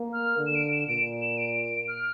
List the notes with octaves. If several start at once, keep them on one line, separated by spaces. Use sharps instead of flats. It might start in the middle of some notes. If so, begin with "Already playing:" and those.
Already playing: A#3
F6
D3
E7
D7
E7
A#2 D7
E7
D7
F6